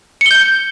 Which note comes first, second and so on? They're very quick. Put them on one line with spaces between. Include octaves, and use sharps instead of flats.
C#7 G7 G6